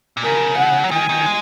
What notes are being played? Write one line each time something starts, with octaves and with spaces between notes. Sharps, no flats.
A#2
C#3 A#4
F#5
F#3
D#3 G#5
D#3
G#3